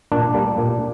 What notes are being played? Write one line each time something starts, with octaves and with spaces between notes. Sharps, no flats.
A#2 D4
G3 A#3
A#2